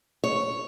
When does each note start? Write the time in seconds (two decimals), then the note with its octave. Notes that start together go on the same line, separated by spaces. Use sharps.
0.24 C#5